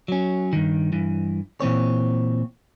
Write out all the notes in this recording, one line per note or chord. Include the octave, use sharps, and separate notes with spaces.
F#3 C#4
G2 D#3
G2 E3
A#2 E3 C4 C#5